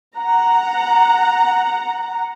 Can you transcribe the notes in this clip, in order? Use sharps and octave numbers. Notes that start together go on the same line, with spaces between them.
F#5 A#5